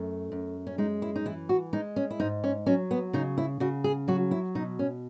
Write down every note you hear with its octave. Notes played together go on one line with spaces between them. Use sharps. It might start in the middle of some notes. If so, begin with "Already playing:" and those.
Already playing: F#2 A3
F#2
C#4
G#3 D#4
E4
D#4
E3 E4
F#4
G#3 D#4
C#4
E4
G#2 D#4
C#4
F#3 C#4
B3
C#3 D#4
E4
C#3 F#4
G#4
F#3 F#4
E4
B2 D#4
C#4